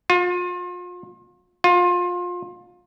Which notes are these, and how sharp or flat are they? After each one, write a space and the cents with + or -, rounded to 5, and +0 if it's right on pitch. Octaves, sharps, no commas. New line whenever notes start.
F4 +35
F4 +25